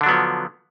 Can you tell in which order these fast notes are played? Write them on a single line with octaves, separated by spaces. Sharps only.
D3 D4 F#3 B3 F3